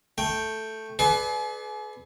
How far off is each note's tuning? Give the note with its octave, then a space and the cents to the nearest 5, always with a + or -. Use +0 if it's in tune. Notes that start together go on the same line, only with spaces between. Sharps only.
A3 +0 G5 +0
G#4 +40 B4 +5 D5 +0